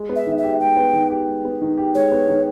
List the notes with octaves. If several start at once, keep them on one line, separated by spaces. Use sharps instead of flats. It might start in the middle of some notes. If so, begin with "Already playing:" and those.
Already playing: G#3
B3
E5
D#3
E5
G4
G#3 G5
B3
D#3
G4
G#3
B3
D#3
G4
G#3 C#5
B3
D#3